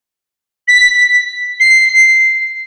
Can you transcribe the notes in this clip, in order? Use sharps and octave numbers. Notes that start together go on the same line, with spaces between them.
B6
C7